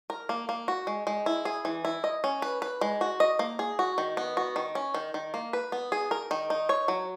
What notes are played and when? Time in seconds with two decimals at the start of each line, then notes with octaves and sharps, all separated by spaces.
0.10 A#4
0.29 A#3
0.49 A#3
0.68 F#4
0.87 G#3
1.07 G#3
1.26 E4
1.45 G#4
1.65 E3
1.85 E4
2.04 D#5
2.24 C#4
2.42 B4
2.62 B4
2.81 G#3
3.01 F#4
3.20 D#5
3.39 A#3
3.59 G#4
3.79 F#4
3.98 D#3
4.17 B3
4.37 F#4
4.56 D#3
4.75 C#4
4.94 D#3
5.14 D#3
5.34 A#3
5.53 B4
5.72 B3
5.92 G#4
6.11 A#4
6.31 D#3
6.50 D#4
6.69 C#5
6.88 F#3